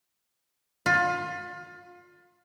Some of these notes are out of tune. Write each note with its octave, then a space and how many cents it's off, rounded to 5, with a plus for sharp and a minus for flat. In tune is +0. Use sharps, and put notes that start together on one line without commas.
F4 +25